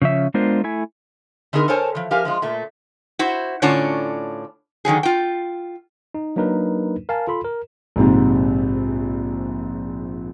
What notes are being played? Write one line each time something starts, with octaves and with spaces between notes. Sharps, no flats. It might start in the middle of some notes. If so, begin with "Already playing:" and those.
C#3 F3 C#4 E5
G#3 B3 D4 F4 A#4 C5
A3 E4 G#5
D3 B3 D#4 G#4 A#4
A4 A#4 C5 C#5 G#5 A5
E3 F3
F3 G4 A#4 F5 G#5
F3 G#3 F4
A#2 A3
E4 F#4 C5
A2 D3 C#4 D4 F4 C#5
D3 D#3 F#3 G#4
F4 G5
D#4
F#3 A#3 D4 D#4 A#4 B4
A#4 F5 G#5 A5
F4 A4 B5 C6
A#4
A#1 G#2 C3